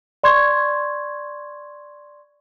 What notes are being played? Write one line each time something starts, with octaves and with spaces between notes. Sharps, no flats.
D5 C6 C#6 G#6